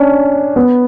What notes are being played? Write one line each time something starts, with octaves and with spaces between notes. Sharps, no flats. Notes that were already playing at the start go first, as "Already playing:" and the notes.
Already playing: C#4 D4
B3